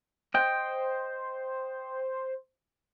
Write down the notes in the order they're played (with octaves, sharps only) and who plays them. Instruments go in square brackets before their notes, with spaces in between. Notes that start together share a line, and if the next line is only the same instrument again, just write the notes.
[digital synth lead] C5 [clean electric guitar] D#5 G5